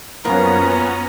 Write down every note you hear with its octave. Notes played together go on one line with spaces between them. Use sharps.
F#2 F3 A#3 B3 C#4 F4 A#5